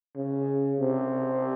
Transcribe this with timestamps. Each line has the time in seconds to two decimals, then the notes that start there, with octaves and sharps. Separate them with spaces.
0.16 C#3
0.80 C3